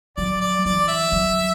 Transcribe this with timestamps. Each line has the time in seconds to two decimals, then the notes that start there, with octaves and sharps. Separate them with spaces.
0.17 F#3 D5
0.41 D5
0.65 E3 D5
0.88 E5
1.12 F#3